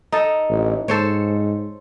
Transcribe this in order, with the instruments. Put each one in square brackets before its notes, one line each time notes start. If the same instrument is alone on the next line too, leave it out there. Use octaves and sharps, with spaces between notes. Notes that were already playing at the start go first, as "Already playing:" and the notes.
[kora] D#4 A4
[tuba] A1
[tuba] G#2 [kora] A4 C5 C#5